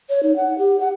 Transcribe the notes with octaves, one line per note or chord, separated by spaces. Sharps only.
C#5
D#4
F#5
G4
F#5